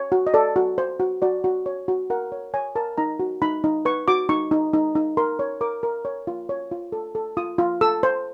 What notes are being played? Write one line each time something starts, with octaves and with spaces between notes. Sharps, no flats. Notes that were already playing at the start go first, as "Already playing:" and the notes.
Already playing: C#5
F#4
D#5
A4 D5
F#4
C5
F#4
F#4 D5
F#4
C#5
F#4
A#4 F#5
C#5
C#5 G#5
A#4 A5
D#4 A#5
F#4
D#4 B5
D#4
B4 C#6
F#4 D6
D#4 C#6
D#4
D#4
D#4
A#4 C6
C#5
A#4 D6
A#4
C#5
F4
C#5
F4
A4
A4
F4 D#6
F4
A4 E6
C5